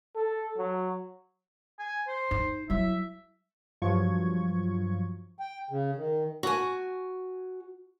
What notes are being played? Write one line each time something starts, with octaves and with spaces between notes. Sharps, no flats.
A4
F#3
G#5
C5
D#4
F#3 E4 E5
G2 F3 F#3 F4 C#6 G#6
G5
C#3
D#3
F#4 G#5